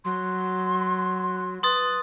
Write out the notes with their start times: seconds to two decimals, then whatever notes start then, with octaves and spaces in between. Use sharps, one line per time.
0.05 F#3 C6
1.63 B4 C6 D#6 A6